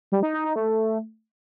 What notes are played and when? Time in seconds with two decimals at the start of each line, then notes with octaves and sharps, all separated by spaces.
0.12 G3
0.23 D#4
0.34 D#4
0.45 D#4
0.56 A3